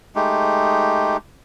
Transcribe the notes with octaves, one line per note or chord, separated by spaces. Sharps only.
G#3 A3 D#4 G4